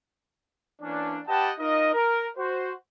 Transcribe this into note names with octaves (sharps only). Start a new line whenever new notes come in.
E3 A#3 C#4 D4
G4 B4 D#5 F#5 G5 A5
D#4 F4 A#4 D#5
A#4
F#4 C5